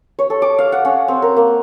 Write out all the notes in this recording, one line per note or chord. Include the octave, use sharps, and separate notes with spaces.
C#5
A4
D6
F5
F#5
C#4
C4
A#4
A#3